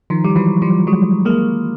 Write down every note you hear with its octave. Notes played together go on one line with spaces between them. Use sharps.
D#3 F3
G3
E3 F#3
F3 G3
F#3 G#3
G#3 A#3